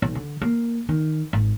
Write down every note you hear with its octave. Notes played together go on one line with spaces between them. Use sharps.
B1
D3
A#3
D#3
G#1